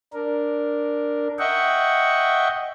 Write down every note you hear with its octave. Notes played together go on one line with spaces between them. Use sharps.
D4 A#4
D#5 E5 F#5 G5 C#6